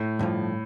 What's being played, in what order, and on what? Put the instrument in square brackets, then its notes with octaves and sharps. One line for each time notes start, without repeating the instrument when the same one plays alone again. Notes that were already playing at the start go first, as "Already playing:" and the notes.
Already playing: [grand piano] A2
[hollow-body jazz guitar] G2 D3 F3